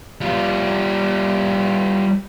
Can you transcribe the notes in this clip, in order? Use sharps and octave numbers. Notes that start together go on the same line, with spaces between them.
G3 F4